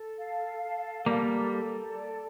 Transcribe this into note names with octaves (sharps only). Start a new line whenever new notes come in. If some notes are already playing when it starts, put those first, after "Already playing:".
Already playing: A4
F5
A4
G3 A#3 A4
A4
D5